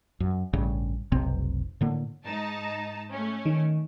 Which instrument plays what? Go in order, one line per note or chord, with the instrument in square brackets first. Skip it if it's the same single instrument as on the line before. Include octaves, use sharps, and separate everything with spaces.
[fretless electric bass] F#2
A1 G2 C#3
F1 B1 C3 C4
A2 D3 A#3
[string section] G#2 D#4 A5
A3 C#4
[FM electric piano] D#3